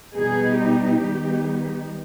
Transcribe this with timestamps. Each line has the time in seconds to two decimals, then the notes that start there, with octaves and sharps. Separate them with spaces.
0.15 B2 G3 B3 D#4 G#4
0.59 G4
1.02 D#3 G3 B3 D#4